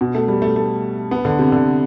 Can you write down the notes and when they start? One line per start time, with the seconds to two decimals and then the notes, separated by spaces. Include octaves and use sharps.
0.01 B2
0.15 A3
0.28 G3
0.42 A3
0.56 A3
1.11 B3
1.25 D3
1.39 C3
1.52 D3